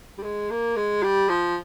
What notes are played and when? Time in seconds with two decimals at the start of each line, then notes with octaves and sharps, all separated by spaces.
0.18 G3
0.23 G#3
0.50 A#3
0.76 G#3
1.02 G3
1.29 F3